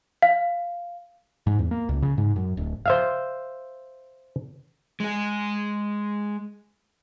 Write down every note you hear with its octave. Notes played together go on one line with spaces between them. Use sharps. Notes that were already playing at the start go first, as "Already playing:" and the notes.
F5
G#2
E2
A#3
C#2
C#3
G#2
F#2
D1
C5 E5 F5
G#3 G#4